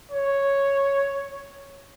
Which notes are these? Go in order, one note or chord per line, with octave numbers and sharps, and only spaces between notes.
C#5